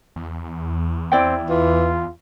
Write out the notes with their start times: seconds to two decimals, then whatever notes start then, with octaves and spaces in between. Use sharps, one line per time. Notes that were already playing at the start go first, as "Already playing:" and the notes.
0.16 E2
1.12 C4 E4 D5 G5
1.49 E3 F4